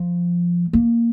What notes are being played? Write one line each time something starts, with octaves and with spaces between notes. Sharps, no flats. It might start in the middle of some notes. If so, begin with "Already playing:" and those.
Already playing: F3
A#3